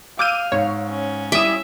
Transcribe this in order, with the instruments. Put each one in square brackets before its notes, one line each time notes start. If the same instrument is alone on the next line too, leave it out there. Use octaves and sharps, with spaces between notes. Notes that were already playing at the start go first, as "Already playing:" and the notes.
[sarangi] F5 [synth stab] D6 D#7 [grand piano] E6 F6 G6
[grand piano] G#2 [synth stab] C#5
[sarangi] C#4
[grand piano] G3 E4 [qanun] E5 [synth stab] D6 D#6